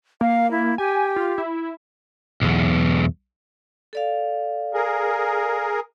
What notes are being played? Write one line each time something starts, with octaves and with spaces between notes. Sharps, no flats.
A#3 F5
E4
G4 G#5
F4
E4
B1 E2
A4 D5 F5
G#4 A#4